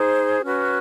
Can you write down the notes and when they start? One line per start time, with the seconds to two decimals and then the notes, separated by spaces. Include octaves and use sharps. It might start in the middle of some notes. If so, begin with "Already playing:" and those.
Already playing: D#4 G#4 C5
0.42 C#4 F#4 B4